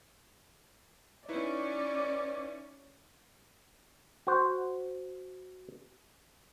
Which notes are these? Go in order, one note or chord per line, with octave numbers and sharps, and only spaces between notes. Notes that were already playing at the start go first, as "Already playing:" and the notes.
C#4 D#4 E4 B4 C#5 D5
F#4 C5